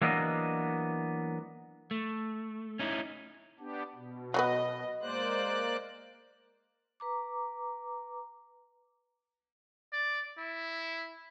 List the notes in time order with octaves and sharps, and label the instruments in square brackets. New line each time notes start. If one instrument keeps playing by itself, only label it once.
[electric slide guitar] E3 F#3 A#3 B3 D4 D#5
A3
C#4 D#4 E4
[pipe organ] B3 D4 G4
B2
[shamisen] F#3 G3 B3 [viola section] D#5
[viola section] G#3 C5 [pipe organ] A#3 D5 F#6
[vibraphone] B4 A#5 D6
[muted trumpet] D5
E4